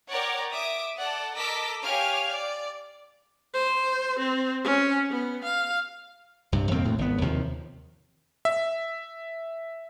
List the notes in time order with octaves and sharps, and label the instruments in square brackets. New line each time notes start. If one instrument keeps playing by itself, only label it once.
[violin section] A#4 C#5 D5 F#5 G5 D6
E5 D6 D#6
A4 D5 F#5
A4 A#4 D#5 D6 E6 B6
G4 C#5 F5 G#5 F6
D5
[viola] C5
C4
C#4
B3
F5
[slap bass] C2 G2 C3
F2 D#3 A#3 C4
D2 A2
G#1 B3
D#2 C3 D#3 F3
[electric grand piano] E5